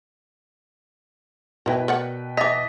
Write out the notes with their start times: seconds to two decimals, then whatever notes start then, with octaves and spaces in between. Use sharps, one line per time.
1.66 B2 E4 A#4 B4 G5
1.88 A#4 D5 F#5
2.37 E3 D#5 F5 D6 A6 B6